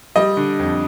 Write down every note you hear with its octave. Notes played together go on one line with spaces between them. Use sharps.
G3 D#5
D3
F2